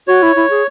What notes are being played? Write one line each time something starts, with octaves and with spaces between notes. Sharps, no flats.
F#4 C#5
E4
E4
G#4